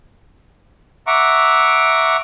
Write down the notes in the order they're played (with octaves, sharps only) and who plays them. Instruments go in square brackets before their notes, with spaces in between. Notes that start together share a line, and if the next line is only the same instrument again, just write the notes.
[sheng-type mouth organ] E5 F#5 A#5 C#6 D6